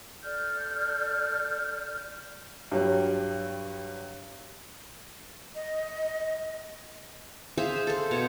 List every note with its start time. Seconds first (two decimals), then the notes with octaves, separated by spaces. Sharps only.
0.24 A4 D5 F6 G6
2.72 G2 F#3 G3
5.55 D#5
7.58 G#4 C5 E5 F5
7.87 A4 C5
8.11 B2 C#5